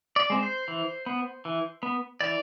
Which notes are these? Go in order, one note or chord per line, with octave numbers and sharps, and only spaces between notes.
D5
G#3 C4
C5
E3
B3
E3
B3
E3 D5